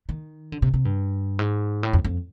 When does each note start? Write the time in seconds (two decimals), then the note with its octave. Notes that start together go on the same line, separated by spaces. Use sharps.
0.09 D#3
0.52 D3
0.62 C3
0.74 C3
0.85 G2
1.39 G#2
1.83 A2
1.93 F2
2.04 F2